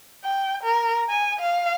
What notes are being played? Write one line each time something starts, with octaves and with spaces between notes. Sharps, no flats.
G5
A#4
G#5
F5